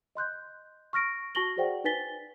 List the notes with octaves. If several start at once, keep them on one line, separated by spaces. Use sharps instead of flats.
D#5 C6 F#6 G6
C#6 F6 A#6 D7
F#4 A5 C#6 A#6 F#7 G7
F#4 G#4 C5 D5 F#5 G5
D#4 B4 G#5 A6 B6 G7